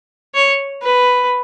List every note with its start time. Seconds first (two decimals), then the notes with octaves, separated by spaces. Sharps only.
0.35 C#5
0.82 B4